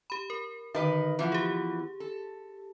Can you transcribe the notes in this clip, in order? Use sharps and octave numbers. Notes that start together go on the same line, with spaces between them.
G4 B5
A#4
D3 D#3 B4 D#5
E3 F3 B3
G4 G#4
A4